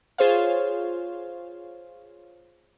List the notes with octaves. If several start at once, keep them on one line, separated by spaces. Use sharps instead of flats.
F4 G#4 C5 C#5 F5